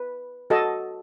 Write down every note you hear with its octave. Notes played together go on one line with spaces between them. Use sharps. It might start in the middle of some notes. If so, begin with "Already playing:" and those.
Already playing: B4
F#4 A4 D#5 A5